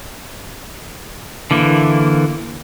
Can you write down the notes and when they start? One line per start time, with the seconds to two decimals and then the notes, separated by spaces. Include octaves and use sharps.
1.51 D3 E3 A#3